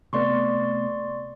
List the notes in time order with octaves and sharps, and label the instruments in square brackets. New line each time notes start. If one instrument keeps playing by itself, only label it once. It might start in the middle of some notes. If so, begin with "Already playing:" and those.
[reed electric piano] C3 A3 B3 [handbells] D5 C6 C#6